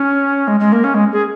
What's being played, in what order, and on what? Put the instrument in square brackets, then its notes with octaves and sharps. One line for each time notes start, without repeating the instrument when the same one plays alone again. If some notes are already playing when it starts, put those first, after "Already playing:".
Already playing: [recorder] C#4
G#3
G#3
A#3
C#4
G#3
G#4